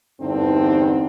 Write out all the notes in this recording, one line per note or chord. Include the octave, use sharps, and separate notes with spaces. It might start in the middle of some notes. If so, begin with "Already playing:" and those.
E2 G2 D3 E3 C4 D#4